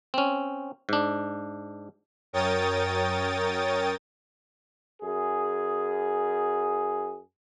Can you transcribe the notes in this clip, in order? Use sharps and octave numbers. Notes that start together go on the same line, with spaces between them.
C4 C#4
G#2 D4
F#2 A#4 C#5 G5 D#6 A6
F#2 G#4